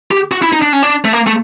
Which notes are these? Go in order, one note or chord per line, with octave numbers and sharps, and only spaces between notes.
G4
F#4
E4
D#4
D4
C#4
D4
A3
A#3
A3